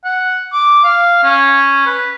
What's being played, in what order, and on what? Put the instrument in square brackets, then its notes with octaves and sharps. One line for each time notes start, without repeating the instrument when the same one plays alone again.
[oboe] F#5
D6
F5
C#4
B4